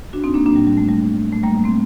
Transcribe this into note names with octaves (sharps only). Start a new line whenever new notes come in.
D4 F#4
C4 D#4
A#3 D4
A2 F#3 A#3 D4
G3
G3
A3
G3
A#2 F#3 A3
G3 A#3
G3 A#3
A3 C4